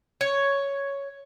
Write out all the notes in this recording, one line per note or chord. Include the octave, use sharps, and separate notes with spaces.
C#5